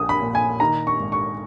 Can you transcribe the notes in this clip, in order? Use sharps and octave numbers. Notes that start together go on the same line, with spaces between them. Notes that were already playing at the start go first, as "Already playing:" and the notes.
Already playing: A#1 D#6
B5
A#2
G#5
D#3 A#5
C#6
G#1
C#6